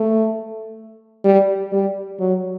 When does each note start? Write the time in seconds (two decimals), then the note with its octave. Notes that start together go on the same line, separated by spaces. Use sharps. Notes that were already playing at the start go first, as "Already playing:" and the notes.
Already playing: A3
1.24 G3
1.72 G3
2.20 F#3